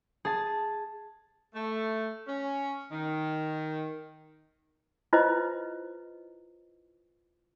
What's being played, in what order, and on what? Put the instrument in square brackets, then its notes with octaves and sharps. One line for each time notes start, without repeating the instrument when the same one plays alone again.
[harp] G#4 A5
[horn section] A3
C#4
D#3
[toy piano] E4 F4 B4 C5 D#5